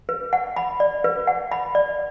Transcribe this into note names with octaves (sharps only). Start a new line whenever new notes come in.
B4
F#5
B5
D5
B4
F#5
B5
D5